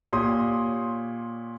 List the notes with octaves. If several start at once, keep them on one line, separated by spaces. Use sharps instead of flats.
A#2 G4 C#5 C6 D#6